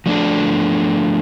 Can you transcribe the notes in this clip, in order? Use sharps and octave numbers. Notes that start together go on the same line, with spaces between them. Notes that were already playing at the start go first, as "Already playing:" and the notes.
F3 A3 D4 A4